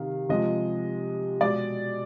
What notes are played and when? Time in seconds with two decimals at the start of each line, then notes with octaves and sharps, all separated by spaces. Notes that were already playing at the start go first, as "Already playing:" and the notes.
Already playing: C3 D#3 F5
0.29 C3 F3 G#3 D#5
1.41 B2 G#3 D5